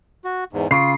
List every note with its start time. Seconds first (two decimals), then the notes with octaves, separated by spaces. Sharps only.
0.24 F#4
0.53 E2 G#2
0.71 C#3 F4 C7